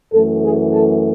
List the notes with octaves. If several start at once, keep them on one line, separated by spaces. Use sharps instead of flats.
F#2 E3 A3 A4
G#4
A4